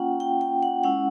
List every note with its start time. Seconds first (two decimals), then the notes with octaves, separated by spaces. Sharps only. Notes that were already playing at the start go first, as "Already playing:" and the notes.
Already playing: A#3 C#4 F4 F#5 G5
0.20 G5
0.41 G5
0.63 F#5
0.84 G#3 C#4 E4 F#5